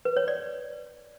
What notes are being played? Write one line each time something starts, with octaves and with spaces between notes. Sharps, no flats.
B4
C#5
D5